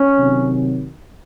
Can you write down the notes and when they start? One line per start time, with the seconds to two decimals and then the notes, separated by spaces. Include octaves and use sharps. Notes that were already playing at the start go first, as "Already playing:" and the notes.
Already playing: C#4
0.16 C3 D#3 F#3